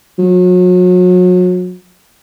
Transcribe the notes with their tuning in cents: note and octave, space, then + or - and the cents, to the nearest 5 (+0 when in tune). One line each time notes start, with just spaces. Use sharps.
F#3 -35